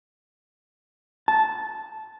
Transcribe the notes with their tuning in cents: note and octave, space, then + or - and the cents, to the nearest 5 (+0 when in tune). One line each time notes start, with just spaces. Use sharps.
A5 -10